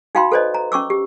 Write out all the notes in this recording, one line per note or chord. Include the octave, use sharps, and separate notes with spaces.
D#4 F#4 F5 G5 B5 C6
A4 B4 C5 D5 D#5
A#5
C#4 C#6 D6 E6
G4